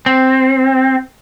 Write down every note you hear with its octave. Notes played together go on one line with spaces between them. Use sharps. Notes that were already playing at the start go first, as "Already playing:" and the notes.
C4